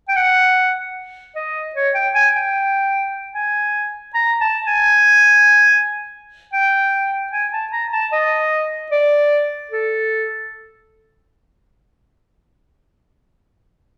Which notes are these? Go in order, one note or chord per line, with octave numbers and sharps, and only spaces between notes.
G5
F#5
D#5
C#5
G5
G#5
G5
G#5
A#5
A5
G#5
G5
G#5
A5
A#5
A5
D#5
D5
A4